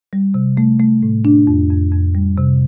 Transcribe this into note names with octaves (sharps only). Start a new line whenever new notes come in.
G3
C3
A3
A3
A2
D4
F2
F2
F2
G3
C3